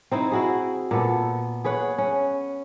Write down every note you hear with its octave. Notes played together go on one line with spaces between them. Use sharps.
C4 D#4 E4
E4 F#4 G#4
A#2 B3 A4
G#4 B4 C#5 F#5
C#4